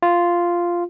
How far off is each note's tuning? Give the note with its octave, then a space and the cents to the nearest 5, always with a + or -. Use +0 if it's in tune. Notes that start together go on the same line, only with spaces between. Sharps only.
F4 -5